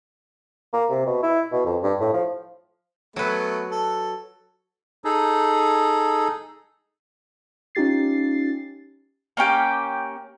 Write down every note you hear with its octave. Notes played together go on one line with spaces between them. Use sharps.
A#3
C3
B2
E4
B2
F2
G2
A2
F3
F#3 A3 B3 B4
A4
D#4 G#4 A4
C#4 D#4 F4 G4 A6 C7
A#3 C#4 G4 G5